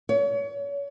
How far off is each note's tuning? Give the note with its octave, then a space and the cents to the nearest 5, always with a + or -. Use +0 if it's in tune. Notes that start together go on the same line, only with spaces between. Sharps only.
C#5 +35